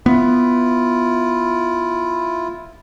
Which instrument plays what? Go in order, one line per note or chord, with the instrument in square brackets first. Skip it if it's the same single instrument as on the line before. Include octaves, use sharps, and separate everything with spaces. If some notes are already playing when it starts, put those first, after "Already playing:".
[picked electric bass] B3 [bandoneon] E4 F4